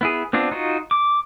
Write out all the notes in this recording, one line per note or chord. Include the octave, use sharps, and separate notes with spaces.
B3 E4 G#4
B3 C4 D4 F4
D#4 F4 F#4
D6